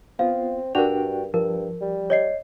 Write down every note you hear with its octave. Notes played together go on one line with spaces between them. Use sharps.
B3 C4 F4 F5
G2 D4 F#4 A#4 G5 F7
G2 F3 A#4
G3
C#5 D#5 C7